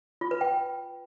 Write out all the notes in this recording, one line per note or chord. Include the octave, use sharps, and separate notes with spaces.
F4
B4
G5